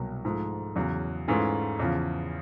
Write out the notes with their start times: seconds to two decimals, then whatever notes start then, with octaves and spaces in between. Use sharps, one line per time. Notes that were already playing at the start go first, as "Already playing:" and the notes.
Already playing: C2 B2 F#3 A#3
0.25 G#2 F3 A3
0.76 E2 C#3 F#3
1.28 G#2 E3 A3 C#4 F4
1.79 E2 C#3 F3